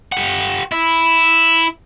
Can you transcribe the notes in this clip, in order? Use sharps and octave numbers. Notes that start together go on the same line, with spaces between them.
G4 F#5
E4